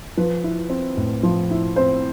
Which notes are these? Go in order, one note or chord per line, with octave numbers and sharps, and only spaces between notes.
F3 B4
E4
C4
A2
F3
E4
C4 C5